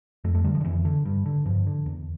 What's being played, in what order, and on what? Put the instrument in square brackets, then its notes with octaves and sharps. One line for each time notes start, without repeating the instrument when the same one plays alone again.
[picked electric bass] F2 A3
A3
D3 G3
F3
D3
F2 E3
D3
G2
D3
G2 F3
D3
E2